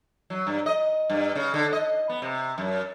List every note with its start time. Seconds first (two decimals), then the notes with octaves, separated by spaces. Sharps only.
0.30 F#3
0.47 G2
0.66 D#5
1.10 G2
1.36 C#3
1.54 D3
1.73 D#5
2.09 B3
2.22 C3
2.58 F#2